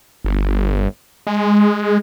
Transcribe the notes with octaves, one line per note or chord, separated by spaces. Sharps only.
G1
G#3